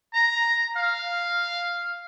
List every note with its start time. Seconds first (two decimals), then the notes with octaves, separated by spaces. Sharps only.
0.15 A#5
0.77 F5